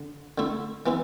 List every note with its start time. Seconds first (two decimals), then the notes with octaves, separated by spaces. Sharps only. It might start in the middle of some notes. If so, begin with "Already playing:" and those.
Already playing: D3
0.38 D3 A3 E4
0.86 E3 B3 E4